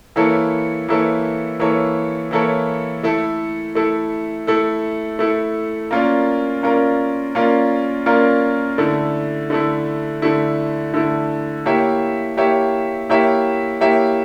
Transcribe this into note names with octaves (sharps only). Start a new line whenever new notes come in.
E3 A#3 E4 A4 C#5
E3 A#3 E4 A4 C#5
E3 A#3 E4 A4 C#5
E3 A#3 E4 A4 C#5
A3 E4 A4
A3 E4 A4
A3 E4 A4
A3 E4 A4
A#3 C#4 F4 A#4 D5
A#3 C#4 F4 A#4 D5
A#3 C#4 F4 A#4 D5
A#3 C#4 F4 A#4 D5
D3 A3 E4
D3 A3 E4
D3 A3 E4
D3 A3 E4
A#3 E4 G4 C#5 E5
A#3 E4 G4 C#5 E5
A#3 E4 G4 C#5 E5
A#3 E4 G4 C#5 E5